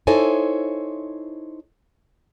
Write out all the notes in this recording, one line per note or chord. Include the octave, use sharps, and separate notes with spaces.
D#4 E4 A4 C5 C#5 G#5